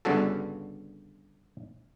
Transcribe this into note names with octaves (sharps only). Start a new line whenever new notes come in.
G1 G2 C#3 F#4 A4